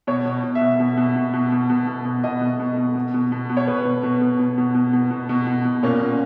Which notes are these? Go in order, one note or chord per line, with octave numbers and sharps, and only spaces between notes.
B2 C#5
B2
B2
E5
B2
B2
B2
B2
B2
B2
B2
B2
B2
B2 D#5
B2
B2
B2
B2
B2
B2
B2
C#5
B2 B4
B2
B2
B2
B2
B2
B2
B2
B2
B2
B2
B2
A#2 C#4
A#2